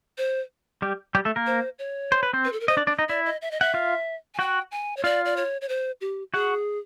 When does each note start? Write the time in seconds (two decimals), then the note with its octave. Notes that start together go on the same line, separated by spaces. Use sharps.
0.18 C5
0.82 G3 G4
1.15 G3 G4
1.25 A3 A4
1.36 A#3 A#4
1.46 C5
1.79 C#5
2.12 C5
2.23 B4
2.33 C4 C5
2.45 B4
2.53 A4
2.60 A#4
2.68 C5 D#5
2.77 D4 D5
2.87 D4 D5
2.99 D#4 D#5
3.09 E4 D5 E5
3.25 D#5
3.42 E5
3.51 D#5
3.60 E5 F#5
3.74 F4 F5
4.34 G#5
4.39 F#4 F#5 G5
4.71 G#5
4.97 C#5
5.04 F4 D5 F5
5.25 D5
5.37 C#5
5.61 C#5
5.69 C5
6.01 G4
6.34 F#4 G#4 F#5